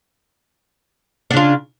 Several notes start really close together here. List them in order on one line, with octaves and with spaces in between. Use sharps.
D4 C#3 F4